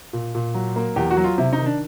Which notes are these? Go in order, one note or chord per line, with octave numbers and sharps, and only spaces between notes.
A#2
A#2
F#3
A#3
E2 G4
F#4
F#3
F4
C3 E4
D#4
D#3
D4